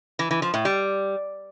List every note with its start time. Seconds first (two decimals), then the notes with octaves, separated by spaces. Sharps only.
0.19 E3
0.31 E3
0.42 F3
0.54 A2
0.65 G3